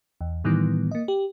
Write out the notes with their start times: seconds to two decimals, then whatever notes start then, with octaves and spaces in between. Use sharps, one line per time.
0.21 E2
0.44 A2 D#3 E3 G3 B3
0.91 A#3 D#5
1.08 G4